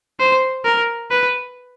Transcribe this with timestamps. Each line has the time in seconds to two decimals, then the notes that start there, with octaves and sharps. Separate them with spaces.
0.20 C5
0.65 A#4
1.10 B4